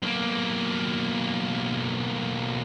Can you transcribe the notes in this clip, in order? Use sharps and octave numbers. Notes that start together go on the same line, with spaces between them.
B1 A#3